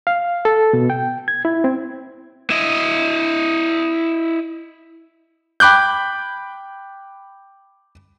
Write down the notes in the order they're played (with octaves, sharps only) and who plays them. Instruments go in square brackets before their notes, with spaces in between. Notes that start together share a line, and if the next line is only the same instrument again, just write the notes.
[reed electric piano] F5
A4
B2
G5
G#6
E4
C4
[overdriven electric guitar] E4 D#5
[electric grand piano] G5 B5 D6 F#6 G6